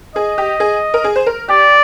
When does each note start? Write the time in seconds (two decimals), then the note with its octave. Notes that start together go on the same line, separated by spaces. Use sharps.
0.15 G#4 D#5
0.38 G4
0.60 G#4
0.94 A#4
1.04 G#4
1.16 C5
1.26 A#4
1.48 G4 D5